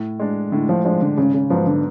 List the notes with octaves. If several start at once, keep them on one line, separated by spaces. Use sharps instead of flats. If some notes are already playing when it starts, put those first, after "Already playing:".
Already playing: A2
G#3 D4
A2 D3
F3
F3 G#3 D4
D3
G#1 C#3
C#3
G#2 F3 F#3 B3
D3